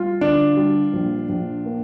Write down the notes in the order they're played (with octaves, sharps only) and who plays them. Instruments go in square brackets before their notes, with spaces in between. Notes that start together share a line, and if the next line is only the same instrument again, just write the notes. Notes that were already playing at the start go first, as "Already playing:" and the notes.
Already playing: [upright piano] G3 [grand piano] F4
[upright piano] D3 [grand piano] D4
[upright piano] G3
A#1
A#1
A#3